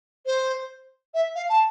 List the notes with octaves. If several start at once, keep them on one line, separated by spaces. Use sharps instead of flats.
C5
E5
F5
A5